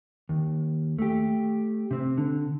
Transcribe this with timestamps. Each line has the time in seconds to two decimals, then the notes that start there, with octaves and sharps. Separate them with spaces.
0.29 D#2
0.99 A3 G4
1.91 C3 C4
2.18 D3